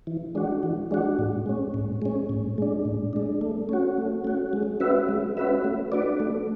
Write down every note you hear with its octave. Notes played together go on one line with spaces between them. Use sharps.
E3
G#3 D4 F#4
E3
G#3 D4 F#4
A2
G#3 C#4
A2
G#3 C#4
A2
G#3 D4
A2
G#3 D4
A3
C#4 F#4
A3
C#4 F#4
G#3
C#4 F#4 B4 E5
G#3
C#4 F#4 B4 E5
A3
D4 F#4 B4 D5
A3